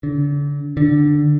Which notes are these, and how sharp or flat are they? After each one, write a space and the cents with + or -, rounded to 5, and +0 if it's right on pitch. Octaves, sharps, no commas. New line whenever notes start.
D3 -35
D3 +5